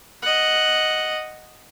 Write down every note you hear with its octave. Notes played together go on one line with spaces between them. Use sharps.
D#5 F#5